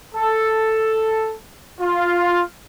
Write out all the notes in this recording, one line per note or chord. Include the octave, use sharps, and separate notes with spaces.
A4
F4